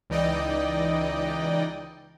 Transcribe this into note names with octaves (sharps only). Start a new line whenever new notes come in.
C#2 E3 D#4 D5 D#5 G5